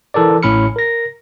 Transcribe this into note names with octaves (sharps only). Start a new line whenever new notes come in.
E3 A4 A#4 D5
A1 A2 C#4 B5 F6 C#7
A#4 A#6